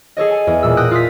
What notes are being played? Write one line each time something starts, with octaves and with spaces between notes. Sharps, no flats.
G#4 A4 C#5 D#5
G#5
E2
E1 A#2 E6
G5 D#6 F#6 G6 A#6
F4 D#6 B6